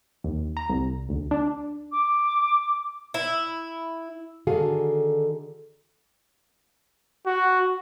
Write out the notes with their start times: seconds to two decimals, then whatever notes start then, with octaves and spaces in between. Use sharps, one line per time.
0.24 D#2
0.57 A#5
0.69 C2
1.09 D2
1.31 D4
1.92 D6
3.14 E4
4.47 D3 D#3 F#4 G#4 A4 F5
7.26 F#4